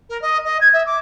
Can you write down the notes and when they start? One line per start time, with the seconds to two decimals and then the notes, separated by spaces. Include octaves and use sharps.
0.09 A#4
0.22 D#5
0.45 D#5
0.61 G#6
0.73 E5
0.86 D6